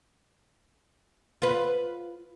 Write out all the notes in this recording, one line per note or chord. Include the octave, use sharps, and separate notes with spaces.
F4 B4